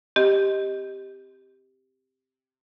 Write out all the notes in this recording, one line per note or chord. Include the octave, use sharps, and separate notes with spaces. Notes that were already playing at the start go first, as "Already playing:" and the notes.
C4 G4 D#5